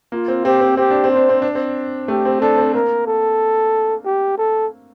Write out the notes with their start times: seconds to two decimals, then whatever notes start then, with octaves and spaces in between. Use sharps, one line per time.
0.12 A#3 F4
0.28 C4
0.45 C4 G4
0.61 C4
0.77 C4 G4
0.91 D4
1.04 C4
1.11 C5
1.16 D4
1.29 C4
1.42 D4
1.55 C4
2.08 A3 G4
2.25 C4
2.41 D4 A4
2.58 C4
2.74 A#3 A#4
3.07 A4
4.06 G4
4.38 A4